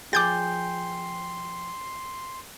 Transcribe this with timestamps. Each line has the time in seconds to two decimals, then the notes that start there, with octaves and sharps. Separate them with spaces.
0.13 F3 G#4 G5 C6 D6 G6 A6